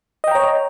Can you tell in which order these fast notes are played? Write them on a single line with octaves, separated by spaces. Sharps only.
D#5 G5 A#5 C#5